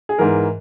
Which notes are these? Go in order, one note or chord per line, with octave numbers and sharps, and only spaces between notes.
G#4
G#2 E3 A#4